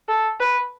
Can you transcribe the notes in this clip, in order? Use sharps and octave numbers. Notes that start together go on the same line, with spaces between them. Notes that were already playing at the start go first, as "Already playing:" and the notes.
A4
B4